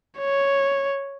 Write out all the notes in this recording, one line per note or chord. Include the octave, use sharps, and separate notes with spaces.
C#5